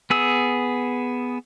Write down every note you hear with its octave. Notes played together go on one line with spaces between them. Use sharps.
B3 G#4 E6